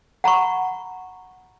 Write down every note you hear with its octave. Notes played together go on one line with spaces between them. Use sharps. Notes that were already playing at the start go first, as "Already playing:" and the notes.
F#5 A#5 B5 C#6